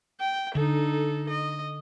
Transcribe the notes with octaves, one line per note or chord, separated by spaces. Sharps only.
G5
D3 D#4 A4
D#5